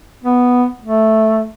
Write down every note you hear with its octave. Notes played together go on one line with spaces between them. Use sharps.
B3
A3